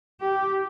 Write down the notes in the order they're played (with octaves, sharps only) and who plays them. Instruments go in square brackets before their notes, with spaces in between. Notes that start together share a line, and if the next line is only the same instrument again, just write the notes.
[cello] G4